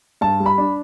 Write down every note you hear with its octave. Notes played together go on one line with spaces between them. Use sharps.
G2 A5
G3
B5
D4